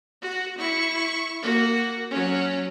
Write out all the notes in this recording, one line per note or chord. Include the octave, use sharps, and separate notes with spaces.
F#4
E4 C#6
A#3 F#4
F#3 C#4